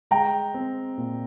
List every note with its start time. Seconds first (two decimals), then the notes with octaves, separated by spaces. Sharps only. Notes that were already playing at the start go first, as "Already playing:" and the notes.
0.11 G#3 G5 A#5
0.54 C4
0.98 A#2